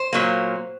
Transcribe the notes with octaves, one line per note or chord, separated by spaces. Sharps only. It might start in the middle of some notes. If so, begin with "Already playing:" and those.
Already playing: C5
A#2 F#3 A#3